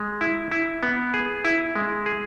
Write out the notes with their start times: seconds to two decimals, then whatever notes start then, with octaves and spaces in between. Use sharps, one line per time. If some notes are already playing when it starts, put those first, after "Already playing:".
Already playing: G#3
0.21 E4
0.51 E4
0.83 B3
1.14 G#4
1.45 E4
1.75 G#3
2.06 G#4